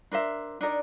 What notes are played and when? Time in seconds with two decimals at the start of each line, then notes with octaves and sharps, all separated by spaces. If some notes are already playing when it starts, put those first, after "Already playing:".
0.12 D4 A#4 C5 E5
0.61 D4 D#4 A#4 D5